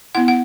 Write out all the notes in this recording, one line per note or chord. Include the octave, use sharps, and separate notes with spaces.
B3 E4 F#5
F#5